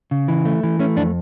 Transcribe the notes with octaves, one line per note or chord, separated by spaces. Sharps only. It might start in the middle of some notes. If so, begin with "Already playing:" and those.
C#3
E3
A3
E3
A3 C#4
F2 D4